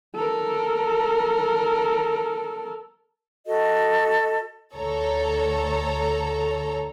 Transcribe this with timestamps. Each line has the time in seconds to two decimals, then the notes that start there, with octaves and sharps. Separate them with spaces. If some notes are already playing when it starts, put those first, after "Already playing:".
0.16 A4 A#4
3.46 F#4 A4 D#5
4.76 D2 A4 C#5 A#5